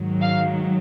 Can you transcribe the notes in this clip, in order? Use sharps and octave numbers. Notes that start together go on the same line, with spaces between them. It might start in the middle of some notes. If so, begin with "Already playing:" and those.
Already playing: G#2 D#3 F#3
F5